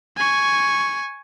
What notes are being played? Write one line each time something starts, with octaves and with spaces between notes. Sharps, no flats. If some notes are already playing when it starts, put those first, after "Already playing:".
G#5 C#6